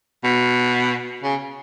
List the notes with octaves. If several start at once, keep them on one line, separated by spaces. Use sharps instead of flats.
B2
C#3